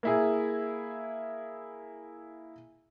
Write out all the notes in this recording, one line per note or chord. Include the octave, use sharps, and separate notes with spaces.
A#3 E4 G#4